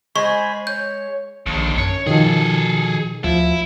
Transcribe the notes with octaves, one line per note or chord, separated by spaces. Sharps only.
G#3 C5 G#5 B5 C#6
C#5 G6
A#1 D#2 D3
F#2 C#5
B2 D#3 F3 G#4 A4
D2 F3 E4